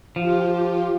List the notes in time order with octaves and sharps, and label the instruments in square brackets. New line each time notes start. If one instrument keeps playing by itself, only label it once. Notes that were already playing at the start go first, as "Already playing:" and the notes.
[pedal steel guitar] F3 [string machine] F4 G4